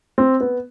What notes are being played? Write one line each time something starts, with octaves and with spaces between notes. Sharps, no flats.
C4
B3